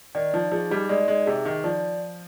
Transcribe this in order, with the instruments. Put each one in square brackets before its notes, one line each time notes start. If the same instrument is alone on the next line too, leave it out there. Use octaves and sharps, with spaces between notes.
[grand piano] D#3 [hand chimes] D5
[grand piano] F3 [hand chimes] D#4
[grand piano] F3 [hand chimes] G#4
[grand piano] G3 [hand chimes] D#4
[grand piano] G#3 [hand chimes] D5
[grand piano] G#3 [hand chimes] D#4
[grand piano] C3 [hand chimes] G#4
[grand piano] D#3 [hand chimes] D#4
[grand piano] F3 [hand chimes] D5